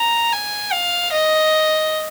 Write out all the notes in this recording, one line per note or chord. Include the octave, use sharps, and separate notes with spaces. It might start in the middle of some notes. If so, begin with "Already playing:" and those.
Already playing: A#5
G#5
F5
D#5